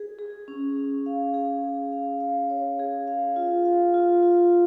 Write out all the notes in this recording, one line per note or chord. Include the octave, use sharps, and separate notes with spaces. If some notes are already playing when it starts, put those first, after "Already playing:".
Already playing: G#4
G#4
C#4
C#4
F5
G#4
G#4
F5
F5
C#5
G#4
F5
F4
F5
F4
F4